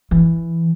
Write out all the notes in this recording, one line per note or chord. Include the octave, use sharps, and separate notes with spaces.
E3